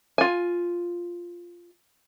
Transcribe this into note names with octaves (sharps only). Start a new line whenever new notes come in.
F4 G#5